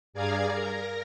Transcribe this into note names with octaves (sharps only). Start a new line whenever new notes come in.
G2 G#4 D5 F5 A#5 G#6
A#4 A#5